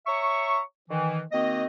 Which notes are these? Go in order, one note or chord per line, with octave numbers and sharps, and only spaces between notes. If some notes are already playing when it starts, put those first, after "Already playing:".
C#5 E5 A#5 C#6
D#3 E3
D#3 A#3 C4 F#4 D#5